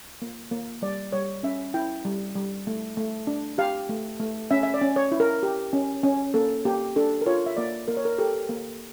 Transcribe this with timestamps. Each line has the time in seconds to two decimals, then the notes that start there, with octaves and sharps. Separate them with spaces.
0.22 A#3
0.51 A#3
0.82 G3 D5
1.13 G3 C#5
1.43 C#4 E5
1.74 E4 G5
2.05 G3
2.35 G3
2.67 A3
2.97 A3
3.27 D4
3.58 G4 F5
3.89 A3
4.20 A3
4.51 C#4 E5
4.63 E5
4.74 D5
4.81 C#4
4.96 C#5
5.12 E4
5.20 A#4
5.43 G4
5.73 C#4
6.03 C#4
6.34 A#3 A4
6.65 A#3 G4
6.96 D4 A4
7.21 A#4
7.26 F4 C#5
7.46 E5
7.57 A#3 D5
7.88 A#3 A#4
7.97 C#5
8.05 A#4
8.18 G4 A4
8.49 A#3